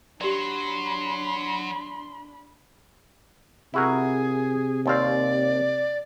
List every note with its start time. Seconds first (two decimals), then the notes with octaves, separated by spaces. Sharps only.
0.21 F#3 D4 G4 D5 B5 C6
3.74 C3 E4 F#4 G#4 A#4
4.86 D#2 C4 D5 F5